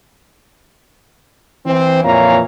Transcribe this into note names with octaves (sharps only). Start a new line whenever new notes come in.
E3 C4
F2 A#2 E3 C#5 F5 A#5